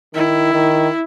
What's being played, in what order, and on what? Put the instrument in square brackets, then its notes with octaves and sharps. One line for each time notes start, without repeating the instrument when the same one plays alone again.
[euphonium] D#3 [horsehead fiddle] E4
[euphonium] D#3